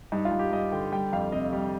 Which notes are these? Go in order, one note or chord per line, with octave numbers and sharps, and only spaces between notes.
G2 D#4
F4
G2
G4
G2 D#5
D3 G5
G3 G5
F2 F5
C3 D#5
G3